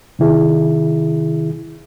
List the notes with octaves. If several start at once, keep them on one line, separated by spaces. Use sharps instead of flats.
C3 D#3 E4 G#4